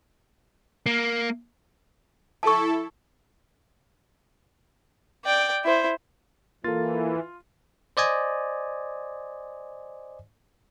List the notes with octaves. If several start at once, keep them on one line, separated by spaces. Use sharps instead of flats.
A#3
E4 A4 A5 C#6
D5 G5
E4 C5
E3 A#3 F4 A4 A6
C5 D5 D#5 G#5